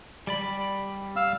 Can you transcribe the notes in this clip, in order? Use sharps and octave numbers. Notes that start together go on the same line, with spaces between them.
G3 D5 B5
F5 E6